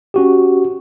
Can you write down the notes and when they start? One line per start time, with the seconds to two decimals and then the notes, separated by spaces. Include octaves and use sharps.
0.14 C#4 F#4 G4